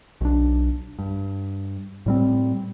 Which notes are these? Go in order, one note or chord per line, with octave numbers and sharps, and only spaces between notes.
B1 D4
G2
A2 G3 C4